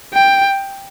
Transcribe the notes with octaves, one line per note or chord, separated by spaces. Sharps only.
G5